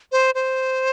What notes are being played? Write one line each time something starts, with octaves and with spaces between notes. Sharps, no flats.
C5
C5